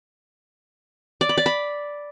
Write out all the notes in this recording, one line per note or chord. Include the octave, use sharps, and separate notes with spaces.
D5
B5
D5
B5